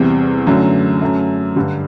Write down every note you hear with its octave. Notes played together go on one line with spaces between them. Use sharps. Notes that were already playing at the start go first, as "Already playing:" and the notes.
Already playing: E2 C3 G3 C4
F#2 D3 F#3 A3
F#2 F#3 A3
G2 D3 G3